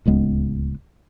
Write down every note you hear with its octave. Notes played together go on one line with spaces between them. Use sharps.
D1 C#2 G#3 B3